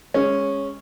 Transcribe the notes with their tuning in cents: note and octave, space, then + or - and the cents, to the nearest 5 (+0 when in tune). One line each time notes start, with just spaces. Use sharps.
G#3 -15 C#4 -5